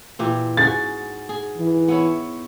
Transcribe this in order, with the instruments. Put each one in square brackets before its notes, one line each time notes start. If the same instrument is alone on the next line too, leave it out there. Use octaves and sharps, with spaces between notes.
[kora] A#2 E3 G4
[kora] G#2 F#4 G#4 [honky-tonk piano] A6
[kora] G#4
[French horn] E3
[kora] B3 E4 C#5